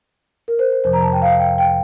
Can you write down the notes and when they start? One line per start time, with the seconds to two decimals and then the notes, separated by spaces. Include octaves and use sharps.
0.48 A#4
0.59 C5
0.72 C5
0.84 F2 C3 F3 C5
0.93 A#5
1.02 A5
1.13 G5
1.22 F5
1.40 G5
1.58 G5